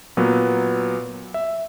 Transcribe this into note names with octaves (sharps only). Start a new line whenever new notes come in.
A#2 F#3 B3 A#4
E5